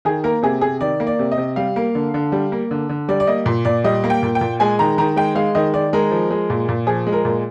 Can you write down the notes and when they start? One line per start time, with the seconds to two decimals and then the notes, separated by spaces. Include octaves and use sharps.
0.05 D#3 G#4
0.24 A#3 A#4
0.43 C3 G#4
0.61 C3 G#4
0.81 D#3 D5
1.00 A#3
1.07 D5
1.19 C3
1.32 D#5
1.38 C3
1.56 G3 F5
1.76 A#3
1.95 D3
2.14 D3
2.32 G3
2.52 A#3
2.71 D3
2.89 D3
3.09 G3 D5
3.20 D5
3.27 A#3 D#5
3.46 A#2
3.65 A#2 D5
3.84 G3 D#5
4.04 A#3
4.10 G5
4.23 A#2
4.35 G5
4.41 A#2
4.60 G#3 G#5
4.79 D#3 A#5
4.98 D#3 A#5
5.16 G#3 G5
5.35 G#3 F5
5.55 D#3 D#5
5.74 D#3 D5
5.93 G#3 A#4
6.11 F3
6.30 G#3
6.50 A#2
6.69 A#2
6.87 F3 G#4
7.07 G#3
7.13 A#4
7.25 A#2